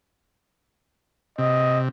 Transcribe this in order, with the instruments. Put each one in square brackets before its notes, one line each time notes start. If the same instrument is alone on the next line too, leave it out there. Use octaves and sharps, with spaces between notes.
[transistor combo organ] C3 [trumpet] D#5